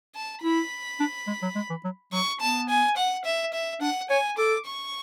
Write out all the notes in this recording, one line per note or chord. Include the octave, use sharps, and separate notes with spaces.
A5
E4 B5
D4
G#3
F#3
G#3
E3
F#3
F#3 C#6
B3 A5
G#5
F#5
E5
E5
D4 F#5
C#5 G#5
A4 D6
C#6